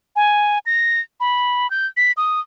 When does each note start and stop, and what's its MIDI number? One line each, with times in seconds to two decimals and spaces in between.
0.16 0.59 80
0.66 1.00 94
1.20 1.69 83
1.71 1.86 91
1.97 2.12 95
2.17 2.40 87